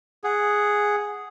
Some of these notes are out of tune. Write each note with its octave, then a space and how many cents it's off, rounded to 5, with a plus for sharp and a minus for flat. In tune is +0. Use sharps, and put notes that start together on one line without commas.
G#4 +0 F#5 +0